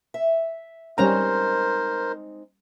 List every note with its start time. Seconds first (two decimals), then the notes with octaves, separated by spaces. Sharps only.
0.14 E5
0.98 G3 G#3 C4 C#4 D#4 A#4 C5 A#5